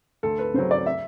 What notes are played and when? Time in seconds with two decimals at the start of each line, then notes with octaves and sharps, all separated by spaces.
0.23 D2 A4
0.39 B4
0.54 C#3 F#3 C5
0.71 D5
0.86 E5